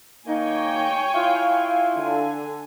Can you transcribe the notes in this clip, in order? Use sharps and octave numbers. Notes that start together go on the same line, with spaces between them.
D#3 A#3 D#4 C#5 G5 G#5
E4 F4 F5
D3 G#5